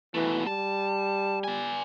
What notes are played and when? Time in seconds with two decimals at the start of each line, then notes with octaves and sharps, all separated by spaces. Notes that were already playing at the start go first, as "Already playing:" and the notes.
0.14 B2 E3 A3
0.47 G3 A5
1.44 D5 G#5